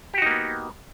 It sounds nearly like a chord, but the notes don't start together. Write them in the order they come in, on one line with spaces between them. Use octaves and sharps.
G4 F#4 D#4 A#3 B3